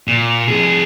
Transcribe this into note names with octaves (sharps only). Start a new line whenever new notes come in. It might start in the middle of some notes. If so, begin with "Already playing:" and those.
A#2
F2 G#4